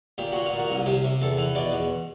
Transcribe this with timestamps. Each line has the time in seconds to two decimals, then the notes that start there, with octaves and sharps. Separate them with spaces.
0.18 A#2 G4
0.32 A#2 F#4
0.46 F4
0.53 A#2
0.58 F#4
0.70 C2
0.86 C3 G4
1.04 C3
1.22 E2 A4
1.38 E3
1.55 B2 D5
1.72 E2